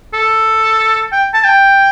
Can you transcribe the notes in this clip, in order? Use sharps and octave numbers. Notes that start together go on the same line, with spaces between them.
A4
G5
A5
G5